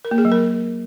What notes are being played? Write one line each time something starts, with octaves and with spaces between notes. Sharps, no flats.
A#4
A#3
G#4
F#3
A#4